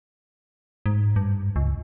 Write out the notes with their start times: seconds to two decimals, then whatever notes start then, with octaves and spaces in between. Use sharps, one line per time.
0.86 G#2
1.16 G2
1.56 C#2